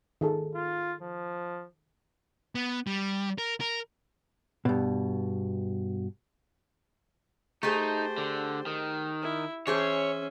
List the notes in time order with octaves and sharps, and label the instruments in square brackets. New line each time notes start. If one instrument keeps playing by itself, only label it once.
[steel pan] D#3 G#4 A4
[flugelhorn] F4
F3
[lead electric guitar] B3
G3
A#4
A#4
[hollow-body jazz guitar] G2 B2
[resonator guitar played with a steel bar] A3 G#4 [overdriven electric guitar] D#4 [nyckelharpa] G4 C5
[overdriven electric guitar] D3
D#3
[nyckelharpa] E4
[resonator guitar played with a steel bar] E3 G#4 C5 [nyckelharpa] C#4 E5 [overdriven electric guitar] C#5